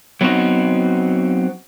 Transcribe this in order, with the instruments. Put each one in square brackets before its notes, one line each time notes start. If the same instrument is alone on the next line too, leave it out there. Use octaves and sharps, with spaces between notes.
[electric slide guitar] F#3 B3 C4 D#4 F#4